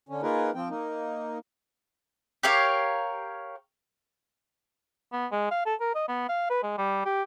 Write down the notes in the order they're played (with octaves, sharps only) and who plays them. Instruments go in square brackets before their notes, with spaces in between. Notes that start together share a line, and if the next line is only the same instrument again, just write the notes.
[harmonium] D3 C#4
A#3 D#4 F4 G#4 A#4 B4
F3 C4 G5
A#3 D#4
[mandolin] G4 A#4 C#5 F5
[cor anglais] B3
G#3
F5
A4
A#4
D#5
B3
F5
B4
G#3
G3
G4